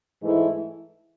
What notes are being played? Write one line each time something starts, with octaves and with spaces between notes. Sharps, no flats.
G#2 E3 A3 E4